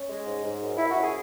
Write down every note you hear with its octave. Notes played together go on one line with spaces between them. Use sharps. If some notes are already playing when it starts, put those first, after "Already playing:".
Already playing: C#4
G#3
G#2
G#2
F#2
F#2 E4
F#4
C#4 G#4